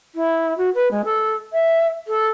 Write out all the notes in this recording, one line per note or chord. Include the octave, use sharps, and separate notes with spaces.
E4
F#4
B4
G#3
A4
E5
A4